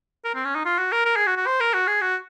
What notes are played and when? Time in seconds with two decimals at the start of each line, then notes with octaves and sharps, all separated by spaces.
0.25 A#4
0.35 C4
0.45 C#4
0.55 D#4
0.65 F4
0.78 F#4
0.92 A#4
1.05 A#4
1.16 G#4
1.26 F#4
1.36 F#4
1.47 C5
1.60 A#4
1.74 F#4
1.88 G#4
2.01 F#4